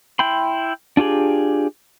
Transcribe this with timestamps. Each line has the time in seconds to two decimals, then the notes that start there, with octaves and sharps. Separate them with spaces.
0.19 E4 G5 B5 C6
0.97 D4 F4 G4 G#4